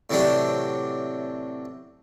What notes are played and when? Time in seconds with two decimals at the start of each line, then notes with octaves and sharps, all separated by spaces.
0.10 A2 C3 E3 F#3 D4 G4